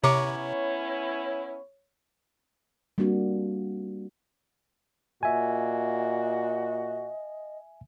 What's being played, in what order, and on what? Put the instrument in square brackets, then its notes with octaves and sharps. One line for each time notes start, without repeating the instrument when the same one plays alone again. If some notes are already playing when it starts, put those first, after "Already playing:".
[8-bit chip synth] C3 [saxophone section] B3 C#4 E4 [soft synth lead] C#5 [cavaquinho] A#5 C#6 D6
[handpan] G3 A#3 C4 D4 F#4
[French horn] A#2 [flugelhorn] F#4 [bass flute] D#5 [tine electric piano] E5 G#5